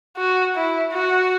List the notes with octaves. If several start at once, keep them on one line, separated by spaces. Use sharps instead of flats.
F#4
E4
F#4